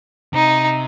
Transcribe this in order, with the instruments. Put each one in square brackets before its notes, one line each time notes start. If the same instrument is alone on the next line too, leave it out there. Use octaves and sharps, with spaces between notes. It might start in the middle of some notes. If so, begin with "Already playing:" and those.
[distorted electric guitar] C3 [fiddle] D#4